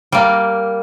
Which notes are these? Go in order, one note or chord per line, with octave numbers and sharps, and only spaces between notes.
G3 A#3